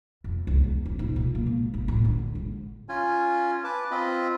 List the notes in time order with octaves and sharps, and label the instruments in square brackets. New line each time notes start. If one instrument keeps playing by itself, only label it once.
[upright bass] F2
C#2
E2
C#4
G#2
A#2
A#3
G#1
G1
A2
D3
G#1
[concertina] C#4 F4 G#5
B4 A5 D6
C4 F4 D#5 B5